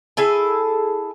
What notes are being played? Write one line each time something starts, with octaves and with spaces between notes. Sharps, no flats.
E4 G#4 A4 G#5